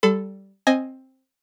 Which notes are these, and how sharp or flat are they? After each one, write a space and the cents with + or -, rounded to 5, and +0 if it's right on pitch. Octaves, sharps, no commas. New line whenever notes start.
G3 -10 A4 +0 B5 +45
C4 +10 D#5 +0 G#5 +0